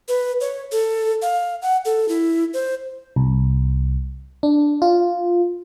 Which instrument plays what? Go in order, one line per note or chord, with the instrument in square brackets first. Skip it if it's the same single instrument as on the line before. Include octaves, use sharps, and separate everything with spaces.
[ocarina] B4
C#5
A4
F5
F#5
A4
E4
C5
[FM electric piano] C2
D4
F4